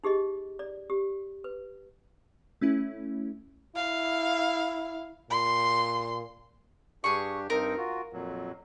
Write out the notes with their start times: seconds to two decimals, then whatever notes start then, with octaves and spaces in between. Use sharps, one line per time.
0.04 D#4 G4 G#4 D#5
0.59 D5
0.90 G4
1.44 B4
2.61 A3 C#4 E4
3.76 E4 F5
5.31 A#2 C6
7.04 G2 D4 G4 G#4 C#6
7.50 G2 C4 D#4 A#4
7.77 F4 F#4
8.13 F2 A#2 F#3